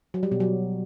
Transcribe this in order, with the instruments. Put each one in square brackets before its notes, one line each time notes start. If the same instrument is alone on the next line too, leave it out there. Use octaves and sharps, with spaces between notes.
[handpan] F#3
G3
B2
F#3